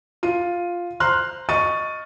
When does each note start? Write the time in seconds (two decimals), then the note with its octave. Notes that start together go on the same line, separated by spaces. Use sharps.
0.23 F4 D#7
1.00 C5 A#5 C6 F6 F#6
1.49 D#5 C#6 A6 D#7